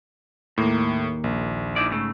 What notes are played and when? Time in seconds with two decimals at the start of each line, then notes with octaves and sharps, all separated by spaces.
0.58 D#2 A2 A#3
1.24 A#1
1.76 D#4 E4 D5
1.91 G#2 C#3 A3